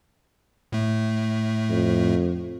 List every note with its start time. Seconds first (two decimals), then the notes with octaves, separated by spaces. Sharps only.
0.72 A2 A3
1.70 F2